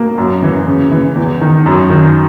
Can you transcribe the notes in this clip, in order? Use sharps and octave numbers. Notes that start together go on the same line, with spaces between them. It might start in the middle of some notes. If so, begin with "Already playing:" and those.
Already playing: B2 A#3
F#2
E3
C#3
E3
E2
D#3
F#2
D#3